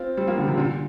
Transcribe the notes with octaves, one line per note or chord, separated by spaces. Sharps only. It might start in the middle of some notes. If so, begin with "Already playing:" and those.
Already playing: C4 F4
G3 C4
F3 A#3
D3 G3
C3 F3
A#2 D3